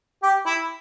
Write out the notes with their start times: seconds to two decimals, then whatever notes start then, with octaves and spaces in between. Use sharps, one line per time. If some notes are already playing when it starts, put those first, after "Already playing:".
0.23 G4
0.46 E4